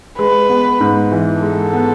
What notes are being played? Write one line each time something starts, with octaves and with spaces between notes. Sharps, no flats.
G#3 B4
B3
G#2
E3
G#3 A4
B3